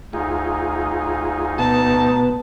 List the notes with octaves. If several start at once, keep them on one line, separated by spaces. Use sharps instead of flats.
D2 D#4 F4 G#4
B2 B3 A5